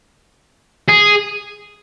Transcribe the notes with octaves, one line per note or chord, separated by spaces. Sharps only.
G#4